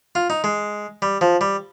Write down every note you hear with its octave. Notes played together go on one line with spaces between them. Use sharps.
F4
D#4
G#3
G3
F3
G3